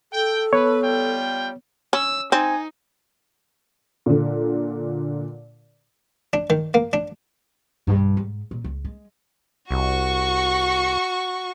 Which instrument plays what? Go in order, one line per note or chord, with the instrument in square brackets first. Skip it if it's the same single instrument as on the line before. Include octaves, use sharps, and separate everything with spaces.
[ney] A4 [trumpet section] G5
[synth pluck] B3 [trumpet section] B4 [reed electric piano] C#5
[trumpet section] G3 F4 G5
[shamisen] C#4 [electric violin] E6
[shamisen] C4 [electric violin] D#4 [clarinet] G#5
[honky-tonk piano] A#2 D3
[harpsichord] D4
D#3
A#3
D4
[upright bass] B1 G2
G#2
A#2
C#2
G#3
[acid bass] C2 [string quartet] F#4 C#6